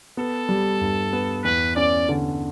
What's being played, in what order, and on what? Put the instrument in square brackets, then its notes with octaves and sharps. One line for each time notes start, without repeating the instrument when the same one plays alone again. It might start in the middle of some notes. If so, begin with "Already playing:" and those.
[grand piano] B3 [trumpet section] A4
[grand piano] G3
G2
B3
[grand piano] E2 [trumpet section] B4
[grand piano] C#4 [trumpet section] D5
[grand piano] D3